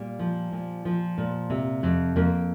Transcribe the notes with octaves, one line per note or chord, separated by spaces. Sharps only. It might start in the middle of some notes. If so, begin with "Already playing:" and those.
Already playing: A#2 G3
F3
A#2
F3
A#2
C3
F2
F2 A#3